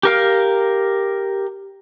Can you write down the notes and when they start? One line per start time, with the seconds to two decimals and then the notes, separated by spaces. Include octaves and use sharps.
0.03 G4 A#4 F5